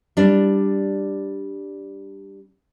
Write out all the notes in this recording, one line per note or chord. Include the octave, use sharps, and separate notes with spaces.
G3 D4